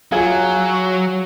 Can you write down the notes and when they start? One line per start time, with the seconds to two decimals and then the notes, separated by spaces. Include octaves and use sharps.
0.12 F#3 F4 G#4